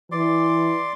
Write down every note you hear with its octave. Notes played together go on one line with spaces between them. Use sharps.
E3 D5 C6 D6